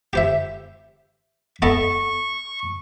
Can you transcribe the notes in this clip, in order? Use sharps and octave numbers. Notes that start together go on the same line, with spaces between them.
G4 C5 E5
B3 A4 D#5 C#6